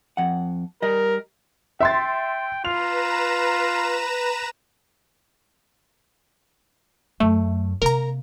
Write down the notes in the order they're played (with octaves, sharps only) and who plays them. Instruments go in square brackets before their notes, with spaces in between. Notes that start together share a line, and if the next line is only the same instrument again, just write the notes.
[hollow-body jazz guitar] F2 F#5
[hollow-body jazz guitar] G3 D#5 [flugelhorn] A#4
[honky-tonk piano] E5 C6 A6 [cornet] G5
[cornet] F4 [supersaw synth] B4 A#5 E7 [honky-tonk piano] F7
[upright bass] F#2 [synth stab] A3
[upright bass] C3 A#3 [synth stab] A#4 A#5